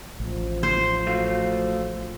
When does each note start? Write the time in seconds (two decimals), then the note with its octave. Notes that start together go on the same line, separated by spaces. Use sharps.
0.20 A1 F3
0.63 C5
1.07 A3 F#4 F5